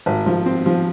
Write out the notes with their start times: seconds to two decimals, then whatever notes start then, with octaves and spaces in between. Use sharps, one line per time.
0.06 G#1
0.26 F3
0.46 C4
0.66 F3